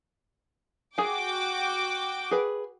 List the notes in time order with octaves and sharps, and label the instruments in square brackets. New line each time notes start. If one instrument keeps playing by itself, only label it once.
[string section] F#4 G5 D6 [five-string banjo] G#4 G#5
[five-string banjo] G#4 B4